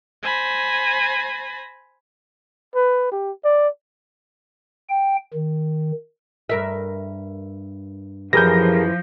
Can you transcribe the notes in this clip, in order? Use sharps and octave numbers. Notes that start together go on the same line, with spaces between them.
C5 G#5 B5 A#6
B4
G4
D5
G5
D#3
G2 A#4 E5
F#2 E3 F3 G4 G#4 A#4 G6 A#6